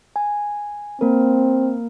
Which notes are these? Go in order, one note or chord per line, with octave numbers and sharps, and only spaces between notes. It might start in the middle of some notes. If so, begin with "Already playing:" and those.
G#5
A#3 C4 A#4